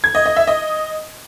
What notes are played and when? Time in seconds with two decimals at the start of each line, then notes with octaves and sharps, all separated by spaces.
0.04 G#6
0.15 D#5
0.26 D#5
0.36 E5
0.47 D#5